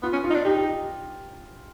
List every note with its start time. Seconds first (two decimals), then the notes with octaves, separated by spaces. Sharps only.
0.03 B3 F4
0.13 C#4
0.24 F4
0.30 D#4
0.35 D4
0.45 D#4 G4
0.56 G4